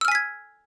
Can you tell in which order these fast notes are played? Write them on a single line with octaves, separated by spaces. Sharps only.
E6 F6 G#5 B6 G#6